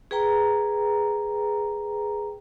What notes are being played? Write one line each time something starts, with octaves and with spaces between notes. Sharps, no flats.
G#4 B4 G5 A#5